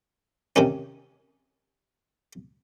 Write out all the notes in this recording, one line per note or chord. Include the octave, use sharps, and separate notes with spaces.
C3 D#3 C#4